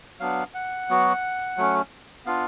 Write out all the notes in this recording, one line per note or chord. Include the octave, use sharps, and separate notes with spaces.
F#3 B3 D4 F5
F#5
F#3 B3 F#4
F#3 A3 C#4
B3 D4 F4 F5